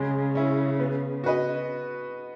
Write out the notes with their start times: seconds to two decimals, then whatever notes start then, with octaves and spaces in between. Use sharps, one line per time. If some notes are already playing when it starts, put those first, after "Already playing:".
Already playing: C#3 G#3
0.35 C#4 E4
0.79 B3
1.24 F#4 B4 D#5